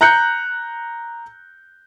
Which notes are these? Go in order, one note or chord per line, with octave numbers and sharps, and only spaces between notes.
A#5 F#6 G6 C#7